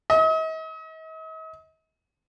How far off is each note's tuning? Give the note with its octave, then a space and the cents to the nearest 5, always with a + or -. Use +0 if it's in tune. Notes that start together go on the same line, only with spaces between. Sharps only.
D#5 +45